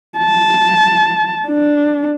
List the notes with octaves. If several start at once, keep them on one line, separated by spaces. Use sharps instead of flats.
A5
D4